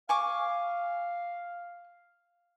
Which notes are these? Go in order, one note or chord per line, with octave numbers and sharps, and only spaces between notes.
F5 G#5 C#6 D6